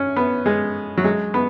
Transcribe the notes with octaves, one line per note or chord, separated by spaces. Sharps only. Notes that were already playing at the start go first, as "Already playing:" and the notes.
Already playing: C#4
B3
G#3
F#3
G#3
B3